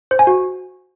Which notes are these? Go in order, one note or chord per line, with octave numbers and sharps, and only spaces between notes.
C5
G#5
F#4